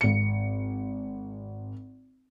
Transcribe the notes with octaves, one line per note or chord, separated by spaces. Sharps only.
G#1 C#7